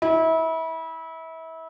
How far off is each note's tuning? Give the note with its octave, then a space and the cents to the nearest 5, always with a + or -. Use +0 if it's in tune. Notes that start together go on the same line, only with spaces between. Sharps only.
E4 -30